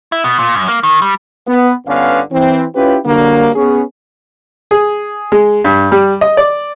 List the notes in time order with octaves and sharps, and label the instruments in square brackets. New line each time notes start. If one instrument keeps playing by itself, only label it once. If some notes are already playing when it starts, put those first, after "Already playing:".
[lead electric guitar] E4
B2
A#2
F#2
A#3
D#3
G3
[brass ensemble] B3
G1 D3 B3 C#4 B4 F5
E3 C4
C#4 E4 F4 G4 B4
D3 F#3 G3 A#3
B3 C#4 G#4
[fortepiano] G#4
G#3
G2
G3
D#5
D5